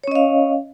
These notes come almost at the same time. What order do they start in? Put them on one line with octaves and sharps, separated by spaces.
C#5 C#4 D#5 F5